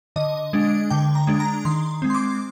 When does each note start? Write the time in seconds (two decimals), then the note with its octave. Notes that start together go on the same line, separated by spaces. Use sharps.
0.16 D3 D#5
0.53 G#3 D4
0.90 D3 G5
1.15 A#5
1.27 G#3 D4
1.40 A#5
1.65 D#3 C6
2.02 G#3 C4
2.10 C6
2.15 D6